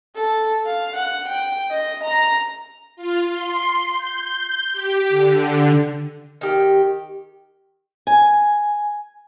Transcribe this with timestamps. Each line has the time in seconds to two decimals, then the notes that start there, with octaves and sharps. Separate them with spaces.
0.16 A4
0.66 F5
0.96 F#5
1.28 G5
1.70 D#5
2.04 A#5
2.96 F4
3.27 C6
3.92 G6
4.73 G4
5.09 D3
6.41 D#3 G4
8.07 G#5